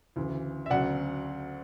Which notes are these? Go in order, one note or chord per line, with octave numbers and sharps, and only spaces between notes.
D2 C#3 E3
E5
D2 C#3 F#3 D5 F#5